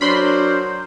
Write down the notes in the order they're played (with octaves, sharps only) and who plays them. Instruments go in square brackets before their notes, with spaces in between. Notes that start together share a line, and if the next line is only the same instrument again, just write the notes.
[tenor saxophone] F#3 [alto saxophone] D4 [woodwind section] A#4 C5 [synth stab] B5 C6